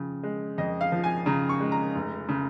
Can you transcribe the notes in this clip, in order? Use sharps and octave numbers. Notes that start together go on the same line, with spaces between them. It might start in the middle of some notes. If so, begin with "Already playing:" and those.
Already playing: F2 C#3 F3
G#3
F2 D#5
F5
F3
G#5
C#3 A#5
C#6
G#3
A#5
F1
C#3